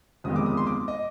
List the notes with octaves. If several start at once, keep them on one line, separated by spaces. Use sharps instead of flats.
G1 F2 D#3 G#3 D#6
D6
D#6
C6
D6
D#5